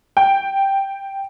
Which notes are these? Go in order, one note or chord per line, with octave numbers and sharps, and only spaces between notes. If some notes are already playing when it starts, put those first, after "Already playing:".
G5